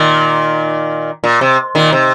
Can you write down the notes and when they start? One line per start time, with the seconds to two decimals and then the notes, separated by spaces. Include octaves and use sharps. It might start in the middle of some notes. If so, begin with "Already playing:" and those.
Already playing: A#2 D#3
1.24 A#2
1.41 C3
1.75 A#2 D#3
1.92 C3